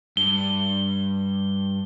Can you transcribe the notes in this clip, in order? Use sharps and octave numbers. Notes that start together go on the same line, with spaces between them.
G2 G7